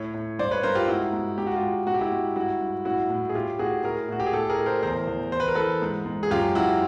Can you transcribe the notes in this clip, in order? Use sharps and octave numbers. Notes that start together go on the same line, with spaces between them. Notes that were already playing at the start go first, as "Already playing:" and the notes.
Already playing: A2 C#5
A2
G2 C5 D5
B4 C#5
G2 A#4 C5
F4 G4
G#2 E4 F#4
G#2
G#2 G4
F#4
F4 G4
G#2
G#2 F#4
G4
E4 F#4
G#2
G2 E4 F#4
G2
A2 E4 F#4
A2
G#4
A2 F4 G4
A2 F#4 G#4
A2 G#4 A#4
A2 F#4
G4
G#4
A2 G4 A4
G#4 A#4
A2
A#4 C5
E2 A#4 C5
E2
E2 C5
B4
A#4
E3 A4 B4
G#2
G#2
G#4
F#2 F4 G4
F#2 E4 F#4